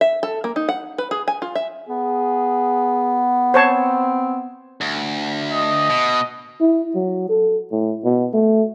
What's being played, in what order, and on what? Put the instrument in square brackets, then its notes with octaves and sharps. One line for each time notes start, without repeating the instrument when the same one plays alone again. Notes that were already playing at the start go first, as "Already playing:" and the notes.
[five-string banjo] E5
A4
A#3
D#4
F#5
B4
G#4
G#5
F4
E5
[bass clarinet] B3 [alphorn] G#4
[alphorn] C4 [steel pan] C5 C#5 A5
[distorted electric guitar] D2
[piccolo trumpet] D#5
[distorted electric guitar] B2
[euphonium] E4
F#3
A4
A2
B2
A3